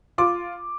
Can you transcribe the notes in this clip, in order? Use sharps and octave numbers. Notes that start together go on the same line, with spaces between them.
F4 D6